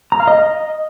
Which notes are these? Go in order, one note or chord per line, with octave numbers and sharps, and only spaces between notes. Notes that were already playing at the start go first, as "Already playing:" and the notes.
A#5
F5
D#5